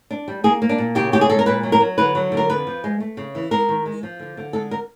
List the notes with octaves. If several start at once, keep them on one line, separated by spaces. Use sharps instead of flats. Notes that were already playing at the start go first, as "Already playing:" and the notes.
D4
G3
A#3 G#4
A#3
D4
A#2
C#3 G4
C#4 G4
G#4
G#3 A4
A#4
A#2 B4
F#3
A#4
F#3
D3 B4
F#3
D3
A#4
F2 B4
F3
G#3
A3
C#3
E3
G#3 A#4
D#3
G#3
F3
D3
D3
G#3 A4
A#4